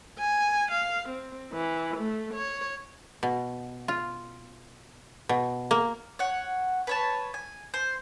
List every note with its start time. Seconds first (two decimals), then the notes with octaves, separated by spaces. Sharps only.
0.19 G#5
0.71 F5
1.09 C4
1.53 E3
1.97 A3
2.34 C#5
3.23 B2
3.88 F4
5.29 B2
5.71 A#3
6.19 C#5 F#5
6.87 B4 C#5 A5
7.34 G#5
7.74 C5